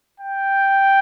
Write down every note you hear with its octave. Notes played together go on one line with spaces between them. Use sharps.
G5